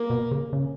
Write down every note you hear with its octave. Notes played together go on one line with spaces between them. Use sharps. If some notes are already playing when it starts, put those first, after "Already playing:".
Already playing: A#3
B2
C#3
C#3